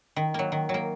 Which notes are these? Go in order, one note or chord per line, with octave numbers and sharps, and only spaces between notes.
D#3
F#3 A#3
D#3
F#3
A#3